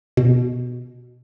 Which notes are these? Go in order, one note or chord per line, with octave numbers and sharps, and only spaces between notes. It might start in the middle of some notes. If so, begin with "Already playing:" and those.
B2